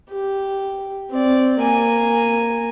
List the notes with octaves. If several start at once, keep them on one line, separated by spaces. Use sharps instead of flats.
G4
C4 D5
A#3 G#5